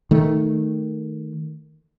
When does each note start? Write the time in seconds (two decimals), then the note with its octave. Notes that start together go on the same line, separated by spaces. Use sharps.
0.11 D#3 A3